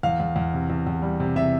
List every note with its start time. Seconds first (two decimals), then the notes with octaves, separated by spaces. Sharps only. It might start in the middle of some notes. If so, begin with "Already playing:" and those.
0.03 E2 F5
0.20 E2
0.36 E2
0.54 C3
0.70 E2
0.87 E2
1.02 G3
1.20 C3
1.36 C3 E5